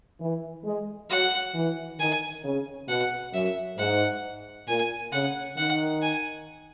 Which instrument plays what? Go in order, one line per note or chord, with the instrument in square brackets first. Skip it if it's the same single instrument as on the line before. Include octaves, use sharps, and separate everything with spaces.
[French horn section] E3
G#3
[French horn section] F#3 [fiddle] F#5
[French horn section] E3
[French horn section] D#3 [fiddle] G#5
[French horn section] C#3
[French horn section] B2 [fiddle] F#5
[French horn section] F#2 [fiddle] E5
[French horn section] G#2 [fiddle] F#5
[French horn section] A#2 [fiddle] G#5
[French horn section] C#3 [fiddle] F#5
[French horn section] D#3 [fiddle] F#5
[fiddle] G#5